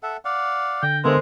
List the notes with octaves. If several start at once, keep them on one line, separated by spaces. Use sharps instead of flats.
A4 E5 F#5
D5 F5 F#5
D3 G5 A#6
D3 G#3 B3 F4 A4 A#4 C5 E5